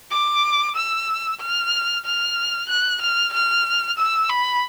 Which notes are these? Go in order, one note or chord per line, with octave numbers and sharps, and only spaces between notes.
D6
E6
F6
F6
F#6
F6
F6
E6
B5